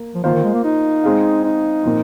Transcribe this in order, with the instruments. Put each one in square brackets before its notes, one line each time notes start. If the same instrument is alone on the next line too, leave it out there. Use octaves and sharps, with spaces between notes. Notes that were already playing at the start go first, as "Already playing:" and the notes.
Already playing: [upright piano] A#3
[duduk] F3
[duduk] D#3 [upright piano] A#3 F4 C5 F5
[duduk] D#3
G#3
A#3
D#4
[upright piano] G#3 C4 G#4 F5
[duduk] D#4
[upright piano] A#2 F3 C4